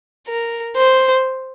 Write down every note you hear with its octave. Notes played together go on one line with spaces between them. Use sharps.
A#4
C5